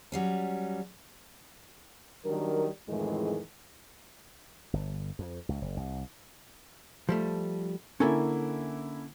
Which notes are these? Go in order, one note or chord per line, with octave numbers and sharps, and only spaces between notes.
F#3 G3 C#4
D#3 F#3 G3 D4 A#4
F2 A2 D#3 E3 G#3 G#4
G1
F2
C#2
F#1
C2
F3 G3 A3
D3 A#3 C#4 E4 A4 G#5